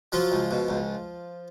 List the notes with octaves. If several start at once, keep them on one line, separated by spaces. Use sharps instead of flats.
F3 F#3 F4
C#2
B2
C#2